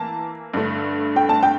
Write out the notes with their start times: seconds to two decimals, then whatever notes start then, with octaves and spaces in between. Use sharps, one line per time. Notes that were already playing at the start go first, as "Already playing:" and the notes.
Already playing: E3 A#3 A5
0.54 G2 D3 A3
1.16 G5
1.29 A5
1.43 G5